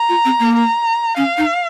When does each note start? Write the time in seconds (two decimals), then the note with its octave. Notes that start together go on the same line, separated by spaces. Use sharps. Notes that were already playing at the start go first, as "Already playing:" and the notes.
Already playing: A#5
0.09 F4
0.25 C4
0.39 A#3
0.55 A#5
1.17 C#4 F5
1.38 D#4